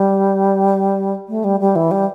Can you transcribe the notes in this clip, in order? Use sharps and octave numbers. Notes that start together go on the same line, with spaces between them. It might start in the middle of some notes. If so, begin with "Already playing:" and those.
Already playing: G3
A3
G3
G3
E3
G3